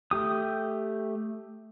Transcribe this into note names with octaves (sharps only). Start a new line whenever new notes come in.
A3 G4 D#6